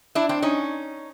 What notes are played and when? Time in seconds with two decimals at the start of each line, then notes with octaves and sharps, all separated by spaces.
0.15 D4 E4
0.29 C4 D4
0.42 C#4 D#4